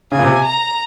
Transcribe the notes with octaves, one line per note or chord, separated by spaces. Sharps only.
C#3 G#5
A#2
C3
A#5